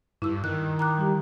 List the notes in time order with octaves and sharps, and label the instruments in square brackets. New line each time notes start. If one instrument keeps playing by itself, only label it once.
[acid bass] G2 [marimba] E4 E6
[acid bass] D#3 [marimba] F#6
[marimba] A#5 D6 F#6
G3 G4